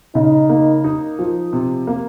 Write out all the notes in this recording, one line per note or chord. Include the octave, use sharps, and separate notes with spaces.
C#3 D#4
A#3
D#4
F3
C3
A#3